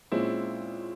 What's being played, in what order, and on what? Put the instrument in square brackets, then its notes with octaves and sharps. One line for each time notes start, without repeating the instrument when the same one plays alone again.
[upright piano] A#2 G#3 C#4 [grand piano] C4 E4